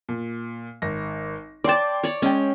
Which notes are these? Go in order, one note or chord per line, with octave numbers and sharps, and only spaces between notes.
A#2
G#1 A#6
D5 G5 A5 C6 D6
C#5 D5
G#3 C#4 G5